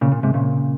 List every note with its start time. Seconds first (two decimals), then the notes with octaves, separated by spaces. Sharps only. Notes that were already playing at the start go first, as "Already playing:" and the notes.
0.01 A#2 C#3
0.12 A#2
0.23 G#2 C3
0.34 A#2 C#3